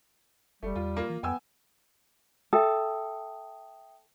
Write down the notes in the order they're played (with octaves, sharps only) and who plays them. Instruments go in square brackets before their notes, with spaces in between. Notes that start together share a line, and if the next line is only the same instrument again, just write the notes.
[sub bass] F#1 [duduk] G3 [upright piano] A3
[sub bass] E2 [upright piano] F4
[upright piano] A#3 F4
[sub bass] E3
[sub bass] F2 [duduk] B3 [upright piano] G5 G#5 E6
[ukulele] A4 [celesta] E5 G5 D#6